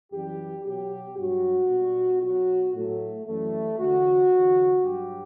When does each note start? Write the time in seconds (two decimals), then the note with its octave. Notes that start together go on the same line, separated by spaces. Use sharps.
0.12 F#2 E3 G3 G4
0.65 B2 F#3 G4
1.17 G2 F#3 F#4
1.70 B2 G3
2.21 B2 F#3 F#4
2.73 A2 F#3 A3
3.26 F#2 E3 G3 A3
3.79 E2 D3 F#3 F#4
4.30 E2 D3 F#3
4.83 G2 F#3 G4